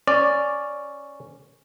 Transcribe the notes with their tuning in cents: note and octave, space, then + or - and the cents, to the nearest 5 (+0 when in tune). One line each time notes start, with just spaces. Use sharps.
C#4 +0 D5 +0